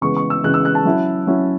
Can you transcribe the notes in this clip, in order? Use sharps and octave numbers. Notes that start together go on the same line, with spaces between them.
C#3 E3 G#3 B3 C#6
C#6
E6
C#3 E3 G#3 B3 F#6
E6
F#6
A5
F#3 C#4 E4
F#3 C#4 E4